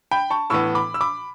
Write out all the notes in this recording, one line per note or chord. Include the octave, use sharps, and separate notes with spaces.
G5 B5
A5 C#6
A2 E3 B3 C#6 E6
B5 D6
E6
B5 D6